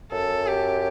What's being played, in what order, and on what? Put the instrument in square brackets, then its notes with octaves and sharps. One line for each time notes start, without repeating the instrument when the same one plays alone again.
[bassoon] F#2 [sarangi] A4
[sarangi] G4